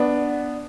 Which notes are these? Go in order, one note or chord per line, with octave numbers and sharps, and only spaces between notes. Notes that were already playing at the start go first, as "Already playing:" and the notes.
Already playing: B3 D4